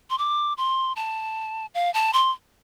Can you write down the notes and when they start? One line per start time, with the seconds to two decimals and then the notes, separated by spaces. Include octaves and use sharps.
0.10 C6
0.18 D6
0.58 C6
0.96 A5
1.74 F5
1.94 A5
2.13 C6